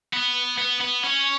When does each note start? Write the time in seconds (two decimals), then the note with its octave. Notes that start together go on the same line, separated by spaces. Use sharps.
0.13 B3
0.58 B3
0.81 B3
1.03 C#4